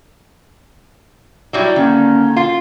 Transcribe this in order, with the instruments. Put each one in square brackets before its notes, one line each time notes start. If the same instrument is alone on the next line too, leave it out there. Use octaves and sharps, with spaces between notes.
[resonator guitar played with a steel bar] F#3 G3 E4
[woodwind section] D3 A#3 C#4 [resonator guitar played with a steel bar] D#3
[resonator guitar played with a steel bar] F4